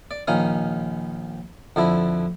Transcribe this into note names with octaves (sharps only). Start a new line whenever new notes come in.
D5
A#1 D#3 C#4 F5 D#6
F2 D3 D4 E4